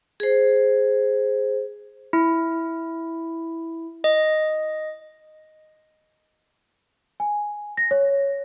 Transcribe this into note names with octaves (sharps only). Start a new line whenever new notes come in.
G#4 C5
E4
D#5
G#5
A#6
C#5